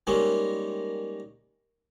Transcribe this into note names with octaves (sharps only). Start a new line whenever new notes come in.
D#3 G3 G#3 A#3 C#4